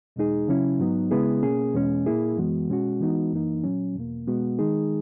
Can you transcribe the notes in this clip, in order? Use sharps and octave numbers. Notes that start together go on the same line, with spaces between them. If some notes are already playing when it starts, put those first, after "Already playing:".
E2 B2 G#3 D#4 G#4
C#3 F#3 C#4 E4
G#2 F#3 B3 D#4
C#3 G#3 B3 E4 G#4
B2 A#3 C#4 G#4
E2 B2 G#3 C#4
A#2 A#3 E4 G#4
F#2 E3 G#3 B3 F#4
B2 G#3 C#4 F#4
E3 G#3 B3 D#4 F#4
F#2 E3 A#3 D#4
A#2 F#3 C#4
E2 B2 A#3
B2 G#3 B3 F#4
D#3 G#3 D#4 G#4